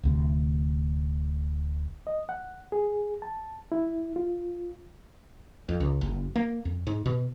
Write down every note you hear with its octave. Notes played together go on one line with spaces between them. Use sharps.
D1 D2 C3
D#5
F#5
G#4
A5
E4
F4
F2
C#2
F#1
A#3
F2
G#2
B2